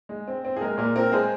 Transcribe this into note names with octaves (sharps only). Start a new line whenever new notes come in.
G#3
C4
C4
G#4
G#3 A#4
A#2 A#4
C4 A#4
G#3 G#4 C5